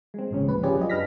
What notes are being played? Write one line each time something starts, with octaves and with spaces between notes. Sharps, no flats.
G#3 C4
G#1 A#2 C#3 C#4
D2 F3 B4
C#4 F4 G4 G#4 D5 G#5
F#3 F4 D#5
F#2 D4 B4 F6 A#6 B6